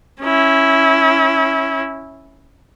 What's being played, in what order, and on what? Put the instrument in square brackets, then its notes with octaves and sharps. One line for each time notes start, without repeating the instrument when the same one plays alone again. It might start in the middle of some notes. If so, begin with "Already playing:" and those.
[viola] C#4 E4